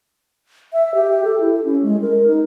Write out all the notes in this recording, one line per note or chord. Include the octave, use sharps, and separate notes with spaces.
E5
G4
A4
E4
C#4
G#3
A#4
D#4